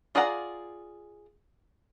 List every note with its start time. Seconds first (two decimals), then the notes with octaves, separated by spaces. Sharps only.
0.15 F4 G#4 D5 F#5 A#5